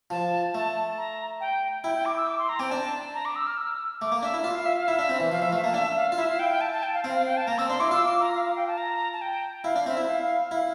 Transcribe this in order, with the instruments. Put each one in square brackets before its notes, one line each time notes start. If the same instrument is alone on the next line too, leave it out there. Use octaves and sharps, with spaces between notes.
[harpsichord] F3 [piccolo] A5
[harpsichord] A3 [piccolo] A5
[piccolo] A#5
G5
[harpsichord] E4 [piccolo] G5
[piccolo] G5
D6
E6
D6
C6
A#5
[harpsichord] C4 [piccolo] G5
[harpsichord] D4 [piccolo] A5
[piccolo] A#5
D6
E6
F6
E6
[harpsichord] A3 [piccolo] D6
[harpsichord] A#3
[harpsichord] D4 [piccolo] E5
[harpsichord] E4
[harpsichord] F4 [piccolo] E5
[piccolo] F5
E5
F5
[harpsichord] E4 [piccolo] E5
[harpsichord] D4
C4
E3
[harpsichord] F3 [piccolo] F5
[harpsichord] F3 [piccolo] E5
[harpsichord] A3 [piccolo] F5
[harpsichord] A#3 [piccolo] A5
[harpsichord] D4 [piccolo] E5
[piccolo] F5
[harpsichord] F4
[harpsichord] E4 [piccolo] E5
[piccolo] F5
G5
G5
A5
A5
G5
F5
[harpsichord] C4 [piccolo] F5
[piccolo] F5
G5
A5
[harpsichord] A#3 [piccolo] A#5
[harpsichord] C4 [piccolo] E6
[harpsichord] D4 [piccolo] C6
[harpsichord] E4 [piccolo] D6
[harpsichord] F4 [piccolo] E6
[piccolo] D6
A#5
F5
F5
G5
A5
A#5
A5
G5
[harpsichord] E4 [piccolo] F5
[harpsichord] D4
[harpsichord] C4 [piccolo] E5
[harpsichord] E4
[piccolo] F5
F5
[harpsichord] E4 [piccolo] F5